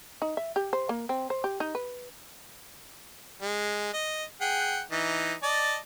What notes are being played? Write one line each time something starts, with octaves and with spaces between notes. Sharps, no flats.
D#4
E5
G4
C5
A#3
C4
C5
G4
D#4
B4
G#3
D#5
G#4 F#5 G5
E3 D#4
D5 D#5 A5